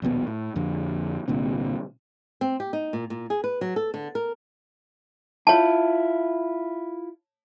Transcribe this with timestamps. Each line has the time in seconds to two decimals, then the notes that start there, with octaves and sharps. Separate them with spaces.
0.02 A#1 D#2 B2 B3
0.27 A2
0.56 F2 D3
1.28 C2 A#2 D3 C4
2.41 C4
2.60 G4
2.73 D#4
2.93 A#2
3.10 A#2
3.30 G#4
3.44 B4
3.61 F#3
3.76 A4
3.94 D3
4.15 A#4
5.47 E4 F4 C#5 A5